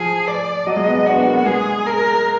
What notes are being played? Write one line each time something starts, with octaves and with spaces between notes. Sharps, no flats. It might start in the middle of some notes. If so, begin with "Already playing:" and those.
Already playing: F3 G#4
D5
F#3 D#5
G#3
B3
B3
D4 F#4
B3
A#3
B3
G#3 G#4
A#4